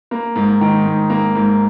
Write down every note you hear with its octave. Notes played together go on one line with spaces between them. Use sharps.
A#3
G#2
D#3
G#2
A#3
G#2